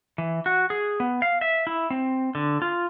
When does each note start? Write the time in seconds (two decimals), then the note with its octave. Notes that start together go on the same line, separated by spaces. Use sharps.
0.18 E3
0.46 F#4
0.70 G#4
1.00 B3
1.22 F5
1.41 E5
1.67 E4
1.90 C4
2.35 D3
2.62 F4